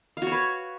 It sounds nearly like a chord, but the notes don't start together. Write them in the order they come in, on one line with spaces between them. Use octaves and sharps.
F5 F#4 C#5 B4